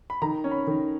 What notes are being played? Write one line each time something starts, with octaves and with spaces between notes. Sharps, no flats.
B5
D#3 A#5
C#4
B5
D#3